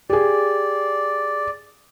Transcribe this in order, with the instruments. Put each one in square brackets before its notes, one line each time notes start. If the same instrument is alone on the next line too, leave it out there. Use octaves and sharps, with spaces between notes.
[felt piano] G4 G#4 [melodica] D5